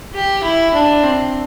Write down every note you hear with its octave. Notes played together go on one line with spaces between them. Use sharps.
G4
E4
D4
C4